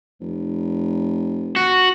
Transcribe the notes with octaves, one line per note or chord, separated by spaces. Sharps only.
F1
F#4